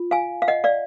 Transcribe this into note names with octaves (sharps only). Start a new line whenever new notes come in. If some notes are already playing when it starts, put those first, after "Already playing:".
Already playing: F4
F5 G#5
F5
D#5 F#5
D5 F5